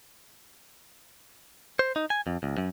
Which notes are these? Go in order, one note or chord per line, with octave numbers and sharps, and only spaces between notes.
C5
D#4
G#5
F2
C#2
F#2